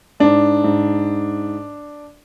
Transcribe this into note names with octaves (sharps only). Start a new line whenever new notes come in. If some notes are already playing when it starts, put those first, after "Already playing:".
G#2 D4
G#2